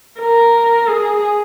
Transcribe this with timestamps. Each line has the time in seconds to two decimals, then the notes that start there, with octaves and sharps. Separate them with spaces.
0.20 A#4
0.88 G#4